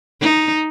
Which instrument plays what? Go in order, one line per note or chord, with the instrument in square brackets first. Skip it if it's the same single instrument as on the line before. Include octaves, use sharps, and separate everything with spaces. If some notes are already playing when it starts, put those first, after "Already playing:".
[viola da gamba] D#4